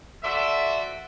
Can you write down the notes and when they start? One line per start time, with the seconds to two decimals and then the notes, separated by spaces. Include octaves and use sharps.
0.24 F#4 A4 C5 D5 E5